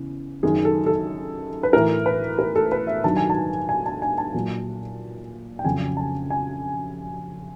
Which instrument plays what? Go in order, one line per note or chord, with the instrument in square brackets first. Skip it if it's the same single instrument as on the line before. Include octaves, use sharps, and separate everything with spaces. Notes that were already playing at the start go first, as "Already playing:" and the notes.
Already playing: [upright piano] E2 C#3
F#2 D#3 F#3 G#4
A4
A4
B4
A2 E3 A#4
B4
A#4
A4
B4
E5
G2 D#3 F#3 A5
G#5
A5
G#5
A5
G#5
A5
A#2 F#3
G5
F2 C#3 F#3 G#5
A5
G#5